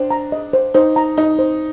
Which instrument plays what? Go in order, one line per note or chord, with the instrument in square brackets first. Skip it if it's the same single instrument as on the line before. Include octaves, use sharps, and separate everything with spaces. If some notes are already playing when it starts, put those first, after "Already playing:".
Already playing: [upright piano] D4 [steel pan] C5
[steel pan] A#5
D#5
C5
[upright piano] D#4 [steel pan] C5
[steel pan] A#5
[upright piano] D#4 [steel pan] D#5
[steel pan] C5